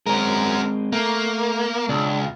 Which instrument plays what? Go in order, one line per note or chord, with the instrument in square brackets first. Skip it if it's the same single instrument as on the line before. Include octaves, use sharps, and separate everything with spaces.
[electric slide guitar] G#3 C4 [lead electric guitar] C#4 A#4
[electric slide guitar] A3 [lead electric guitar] A#3
[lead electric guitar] C#2 [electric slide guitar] D4